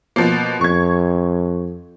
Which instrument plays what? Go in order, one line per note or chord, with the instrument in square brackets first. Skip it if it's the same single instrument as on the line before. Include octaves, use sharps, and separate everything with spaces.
[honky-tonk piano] B2 F3 A#3
[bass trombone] F2 [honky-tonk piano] C#6 G#6